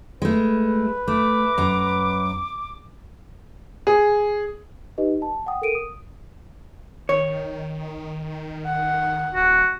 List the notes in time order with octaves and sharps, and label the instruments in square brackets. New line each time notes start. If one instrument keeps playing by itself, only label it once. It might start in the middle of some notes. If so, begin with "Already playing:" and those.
[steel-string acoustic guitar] G#3 A3 [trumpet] B4
[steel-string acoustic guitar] A3 [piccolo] D6
[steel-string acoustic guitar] F#2 A#5
[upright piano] G#4
[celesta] D#4 G4 B4 D#5
A5
F#5 G5 D#6
A4 A#4 D7 D#7
D#6
[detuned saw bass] D#3 [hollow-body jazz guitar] C#5
[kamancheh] F#5
[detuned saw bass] D1 [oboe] F#4